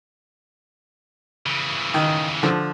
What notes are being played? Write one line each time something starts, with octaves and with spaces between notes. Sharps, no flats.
C#3 E3
D#3
D3 F3